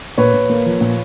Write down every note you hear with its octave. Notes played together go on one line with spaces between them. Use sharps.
A#2 B4 C#5
A#2
A#3
F3
A#2